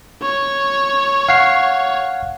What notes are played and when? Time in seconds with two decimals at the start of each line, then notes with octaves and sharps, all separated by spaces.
0.22 C#5
1.29 F5 F#5 C7